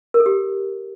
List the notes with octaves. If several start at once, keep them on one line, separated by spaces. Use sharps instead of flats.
A#4
A4
G4